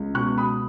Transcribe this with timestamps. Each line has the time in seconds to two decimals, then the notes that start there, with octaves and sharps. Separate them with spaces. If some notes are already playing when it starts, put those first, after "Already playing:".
Already playing: C#2
0.14 B2 C#6 F#6
0.38 B5 D#6